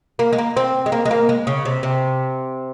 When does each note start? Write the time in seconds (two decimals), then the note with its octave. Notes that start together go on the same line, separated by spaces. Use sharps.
0.19 A#3
0.33 G#3
0.38 A#3
0.57 C4
0.86 G#3
0.92 A#3
1.05 G#3
1.11 A#3
1.29 G#3
1.47 C#3
1.65 C3
1.83 C3